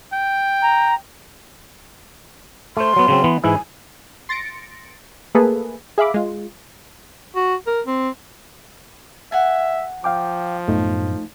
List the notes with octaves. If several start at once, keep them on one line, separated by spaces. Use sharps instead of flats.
G5
A#5
A3 C5 C6
F#3 B3
C#3 F#3 C4
E3 B3
G#2 E3 E4 G#5
C6 A6 A#6 C#7 D7
A3 A#3 G#4 A4 B4
G#4 E5 F5 B5 D6
G#3 F4
F#4
A#4
C4
E5 F#5 G#5
F3 F5 G5 D6
F#2 A2 A3 B3 D#4